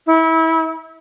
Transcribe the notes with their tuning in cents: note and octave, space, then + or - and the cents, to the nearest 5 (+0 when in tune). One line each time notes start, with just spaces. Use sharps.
E4 -25